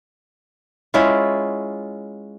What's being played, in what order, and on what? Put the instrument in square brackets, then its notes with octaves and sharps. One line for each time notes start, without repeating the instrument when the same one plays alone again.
[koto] G#3 C#4 E4 F4